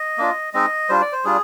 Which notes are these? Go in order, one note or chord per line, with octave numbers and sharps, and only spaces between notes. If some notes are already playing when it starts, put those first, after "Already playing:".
Already playing: D#5
A#3 D4 F4
G#3 C4 D#4 D#5
G3 D4 F4 C5
D5
C5
G3 D4 F4 G#4